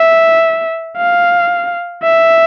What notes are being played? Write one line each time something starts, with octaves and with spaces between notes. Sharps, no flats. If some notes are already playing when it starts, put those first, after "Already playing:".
Already playing: E5
F5
E5